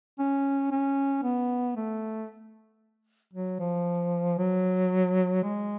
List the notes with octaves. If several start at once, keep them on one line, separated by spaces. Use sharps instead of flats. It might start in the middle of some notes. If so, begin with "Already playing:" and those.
C#4
C#4
B3
A3
F#3
F3
F#3
G#3